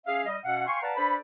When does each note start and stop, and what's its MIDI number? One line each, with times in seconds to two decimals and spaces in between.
0.06 0.25 61
0.06 0.25 68
0.06 0.25 76
0.06 0.25 77
0.26 0.37 55
0.26 0.37 75
0.44 0.66 47
0.44 0.66 61
0.44 0.66 77
0.44 0.66 78
0.66 0.79 77
0.66 0.79 79
0.66 0.79 80
0.66 0.79 84
0.66 0.79 85
0.82 0.92 71
0.82 0.92 74
0.82 0.92 77
0.82 0.92 78
0.82 0.92 81
0.82 0.92 82
0.96 1.15 62
0.96 1.15 69
0.96 1.15 71
0.96 1.15 72
0.96 1.15 74
0.96 1.15 83